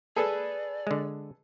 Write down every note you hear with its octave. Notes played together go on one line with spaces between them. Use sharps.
G#4 A4 B4 D5
D3 G#3